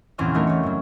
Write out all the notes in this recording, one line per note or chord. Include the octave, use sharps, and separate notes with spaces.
F#1 E2 A#2 C4 C#4 F6
G3 A3 D#4 A#4
E2 C#5
F#2 F#3